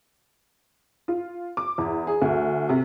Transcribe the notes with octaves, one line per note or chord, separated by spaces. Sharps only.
F4
D6
E2
G#4
D2
C3